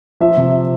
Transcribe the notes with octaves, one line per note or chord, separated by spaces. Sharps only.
F3 E5
C3